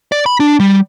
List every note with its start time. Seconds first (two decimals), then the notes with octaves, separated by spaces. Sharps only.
0.12 D5
0.26 B5
0.40 D4
0.60 G3